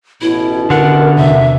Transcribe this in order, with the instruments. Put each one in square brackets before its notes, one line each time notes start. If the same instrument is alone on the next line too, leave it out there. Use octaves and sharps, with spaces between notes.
[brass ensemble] A1 B2 [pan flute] E4
[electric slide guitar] D3 F#5 [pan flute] A#4
[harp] E2 C3 [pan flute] E5